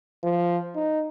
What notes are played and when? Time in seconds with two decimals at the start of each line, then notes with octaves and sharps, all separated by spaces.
0.23 F3
0.75 D#4